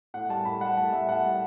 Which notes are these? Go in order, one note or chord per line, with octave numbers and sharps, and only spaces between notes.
A2 F#5
G3 A5
A2 B5
G3 F#5
A2 A5
G3 E5
A2 F#5
G3